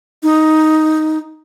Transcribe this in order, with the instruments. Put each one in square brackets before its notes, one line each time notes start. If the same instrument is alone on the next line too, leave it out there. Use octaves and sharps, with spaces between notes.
[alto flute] D#4